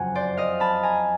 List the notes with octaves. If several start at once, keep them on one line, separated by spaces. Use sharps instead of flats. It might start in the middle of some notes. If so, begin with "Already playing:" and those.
Already playing: F#1 F2 F#5 G#5
C5 D5
D#5 F5
A5 B5
G#5 A#5